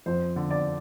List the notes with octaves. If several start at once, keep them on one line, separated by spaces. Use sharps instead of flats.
F2 C5
D3
D5